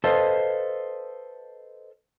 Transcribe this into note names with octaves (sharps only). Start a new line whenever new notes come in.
A4 B4 C5 D#5 F5 A5